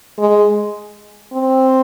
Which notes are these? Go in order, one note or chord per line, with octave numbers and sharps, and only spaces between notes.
G#3
C4